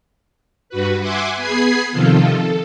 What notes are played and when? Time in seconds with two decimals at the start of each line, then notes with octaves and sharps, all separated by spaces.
0.69 G2 F#4 B4
1.00 E5 F#5 G#5 C6 D6
1.36 B3 G#4 G#5 B5 G#6 C7
1.91 C3 D#3 F3 F4 A4
2.33 A4